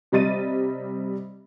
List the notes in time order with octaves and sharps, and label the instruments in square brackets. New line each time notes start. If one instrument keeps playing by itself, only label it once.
[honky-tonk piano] C3 G3 D#5 A6 D#7